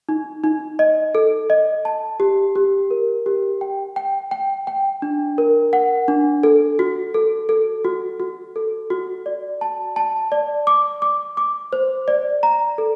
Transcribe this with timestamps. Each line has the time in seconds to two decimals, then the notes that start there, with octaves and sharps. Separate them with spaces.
0.09 D#4
0.44 D#4
0.79 D#5
1.15 A4
1.50 D#5
1.85 A5
2.20 G4
2.55 G4
2.91 A#4
3.26 G4
3.61 G5
3.96 G5
4.31 G5
4.67 G5
5.02 D4
5.38 A#4
5.73 F#5
6.08 D4
6.43 A4
6.79 F#4
7.14 A4
7.49 A4
7.84 F#4
8.20 F#4
8.56 A4
8.90 F#4
9.26 D5
9.61 A5
9.96 A5
10.32 D5
10.67 D6
11.02 D6
11.37 D6
11.73 C5
12.08 D5
12.43 A#5
12.78 A4